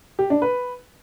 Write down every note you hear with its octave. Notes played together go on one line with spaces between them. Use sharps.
G4
D4
B4